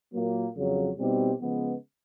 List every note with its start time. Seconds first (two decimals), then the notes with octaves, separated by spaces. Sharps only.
0.13 A#2 F#3 A#3
0.55 F2 C#3 F#3
0.97 B2 G3 C4 D#4 G4
1.40 C#3 F3 G#3 B3